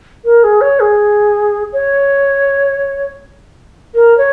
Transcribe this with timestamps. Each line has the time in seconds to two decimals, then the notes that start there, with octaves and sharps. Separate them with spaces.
0.24 A#4
0.43 G#4
0.60 C#5
0.79 G#4
1.72 C#5
3.94 A#4
4.17 C#5